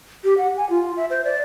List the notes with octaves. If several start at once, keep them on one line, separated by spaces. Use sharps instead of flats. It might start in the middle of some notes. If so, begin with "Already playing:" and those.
G4
F#5
G#5
F4
E5
C5
D5